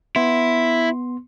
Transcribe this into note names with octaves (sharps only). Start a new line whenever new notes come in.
B3 E4 C6